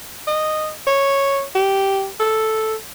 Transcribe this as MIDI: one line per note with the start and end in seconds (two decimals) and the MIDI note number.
0.27 0.70 75
0.87 1.43 73
1.55 2.08 67
2.20 2.75 69